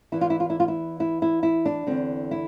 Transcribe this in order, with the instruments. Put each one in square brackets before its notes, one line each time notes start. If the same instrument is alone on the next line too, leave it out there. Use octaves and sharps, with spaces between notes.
[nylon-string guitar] E2 E3 E4
F4
E4
F4
E4
F4
E4
E4
E4
E4
D4
E2 D3 C4
E4